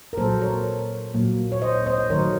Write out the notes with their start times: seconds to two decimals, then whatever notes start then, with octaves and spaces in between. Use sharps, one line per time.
0.13 A#4
0.18 A#2 F#3 A#3 A4 C5
0.41 A#4 C#5
1.14 A#2 F#3 A#3
1.52 C#5
1.62 C5 D#5
1.86 C5 D#5
2.10 D#3 F#3 A3 A#4 C#5